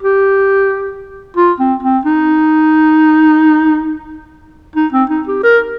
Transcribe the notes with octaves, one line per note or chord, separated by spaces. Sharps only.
G4
F4
C4
C4
D#4
D#4
C4
D#4
G4
A#4